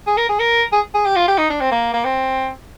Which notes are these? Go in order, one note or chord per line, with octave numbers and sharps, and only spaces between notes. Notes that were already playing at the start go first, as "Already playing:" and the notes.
G#4
A#4
G#4
A#4
G#4
G#4
G4
F4
G4
D#4
D4
C4
A#3
A#3
C4